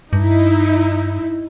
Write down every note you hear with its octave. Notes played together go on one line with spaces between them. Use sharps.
G2 D#4 E4